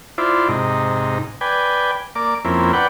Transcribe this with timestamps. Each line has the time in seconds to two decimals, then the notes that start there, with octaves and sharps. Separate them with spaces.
0.18 E4 F4 C5 D5
0.48 G#2 C3 D#4
1.41 B4 D5 G5 G#5
2.15 A#3 D5 D6
2.45 F2 A#3 C4 C#4 E4
2.73 B4 D5 F#5 G5